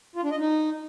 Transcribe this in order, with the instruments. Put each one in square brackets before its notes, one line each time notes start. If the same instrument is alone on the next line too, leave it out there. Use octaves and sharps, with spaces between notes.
[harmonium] F4
D4
D#5
D#4